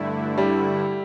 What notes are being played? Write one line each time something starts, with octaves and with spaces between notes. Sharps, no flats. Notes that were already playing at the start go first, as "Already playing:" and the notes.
Already playing: G2 D3 A3 E4
G3